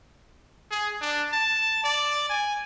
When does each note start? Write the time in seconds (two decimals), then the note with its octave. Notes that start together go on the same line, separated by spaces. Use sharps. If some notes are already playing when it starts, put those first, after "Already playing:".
0.71 G#4
1.01 D4
1.32 A5
1.84 D5
2.30 G#5